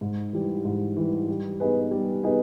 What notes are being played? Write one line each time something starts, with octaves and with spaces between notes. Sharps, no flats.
G#2
E3 G3
G#2
E3 G3
G3
B3 D#4 G#4 B4
G3
B3 D#4 G#4 B4